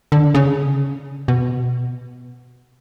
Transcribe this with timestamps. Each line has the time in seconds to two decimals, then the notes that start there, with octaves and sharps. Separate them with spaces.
0.12 D3
0.35 C#3
1.28 B2